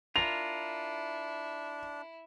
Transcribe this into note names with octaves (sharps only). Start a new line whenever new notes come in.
D4 E4 F4 A#4 F7